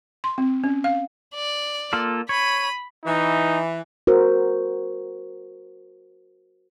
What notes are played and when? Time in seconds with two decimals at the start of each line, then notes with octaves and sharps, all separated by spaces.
0.24 C6
0.38 C4
0.64 C#4
0.84 F5
1.35 D5
1.93 A#3 F4 A4
2.29 C#5 B5 D#7
3.05 E3 D#4
4.07 F#4 A#4 C5